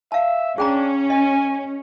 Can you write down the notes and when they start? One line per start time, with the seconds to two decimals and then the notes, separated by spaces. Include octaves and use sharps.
0.12 E5 F5 A5
0.58 C#4 D4 G#4 G5 A#5
1.10 D#5 G#5